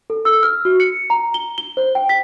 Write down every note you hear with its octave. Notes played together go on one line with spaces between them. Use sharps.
A4
E6
F6
F#4
C#7
A#5
G7
G7
C5
G5
B6